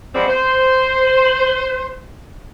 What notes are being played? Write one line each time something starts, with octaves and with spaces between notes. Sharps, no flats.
F3 F#3 G#3 B3 C4 D5
C5